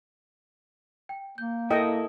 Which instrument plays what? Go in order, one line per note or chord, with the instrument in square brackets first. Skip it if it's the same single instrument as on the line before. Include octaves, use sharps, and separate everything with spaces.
[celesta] G5
[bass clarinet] A#3 [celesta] G6
[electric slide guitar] E4 A4 [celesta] A#4 D#6 [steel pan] D#5 G5